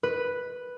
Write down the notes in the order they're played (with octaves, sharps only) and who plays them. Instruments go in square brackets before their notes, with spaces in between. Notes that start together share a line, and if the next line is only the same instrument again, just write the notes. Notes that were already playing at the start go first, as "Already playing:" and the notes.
[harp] B4